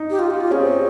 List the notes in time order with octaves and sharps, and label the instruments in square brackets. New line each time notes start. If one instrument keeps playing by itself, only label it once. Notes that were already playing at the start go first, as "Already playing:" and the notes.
Already playing: [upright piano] D#4
[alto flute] G4
F4
G4
F4
[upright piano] C#4 [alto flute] G#4
[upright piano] C4